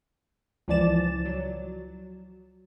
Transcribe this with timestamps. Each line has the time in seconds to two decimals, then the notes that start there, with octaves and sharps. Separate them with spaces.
0.68 C#2 E3 F3 D5 A6 E7
1.26 F#3